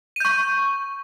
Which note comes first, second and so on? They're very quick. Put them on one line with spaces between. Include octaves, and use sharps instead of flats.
D#7 G6 C#6